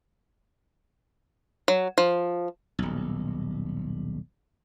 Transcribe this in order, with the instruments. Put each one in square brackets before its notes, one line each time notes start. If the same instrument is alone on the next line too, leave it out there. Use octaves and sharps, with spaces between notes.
[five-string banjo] F#3
F3
[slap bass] D#1 B1